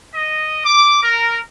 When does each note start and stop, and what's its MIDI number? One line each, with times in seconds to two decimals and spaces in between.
0.14 0.59 75
0.64 1.01 86
1.02 1.38 70